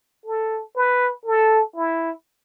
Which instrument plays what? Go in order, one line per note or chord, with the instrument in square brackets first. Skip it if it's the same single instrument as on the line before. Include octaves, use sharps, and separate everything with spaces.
[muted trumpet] A4
B4
A4
E4